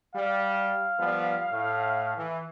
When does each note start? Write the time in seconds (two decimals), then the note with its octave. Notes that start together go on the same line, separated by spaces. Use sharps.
0.15 G3 F5
0.99 F3 G3 B3
1.51 A2
2.17 E3